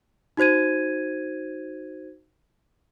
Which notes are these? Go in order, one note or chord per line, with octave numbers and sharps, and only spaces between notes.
D#4 F#4 C5 G#6 D#7